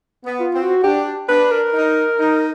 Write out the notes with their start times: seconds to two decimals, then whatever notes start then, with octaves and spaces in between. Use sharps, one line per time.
0.24 B3
0.40 F4
0.54 C4
0.62 F#4
0.83 D4 G4
1.28 D4 B4
1.51 A#4
1.73 D#4
2.19 D#4